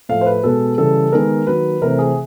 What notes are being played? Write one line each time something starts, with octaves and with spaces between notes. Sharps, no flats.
A2 F3 A3 F5
C5
B4
B2 G#3 B3 A4
C#3 E3 G3 A4
D#3 G#3 B3 A#4
D#3 F#3 A#3 B4
C3 E3 A3 C4 A#4
G#4